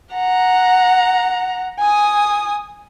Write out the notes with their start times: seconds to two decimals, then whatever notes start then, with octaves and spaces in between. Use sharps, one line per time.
0.13 F#5 A#5
1.80 G#5 D#6